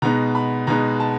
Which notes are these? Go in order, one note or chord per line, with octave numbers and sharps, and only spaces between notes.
B2 G#3 B3 D#4 A#5
B5
B2 G#3 B3 D#4 A#5
A5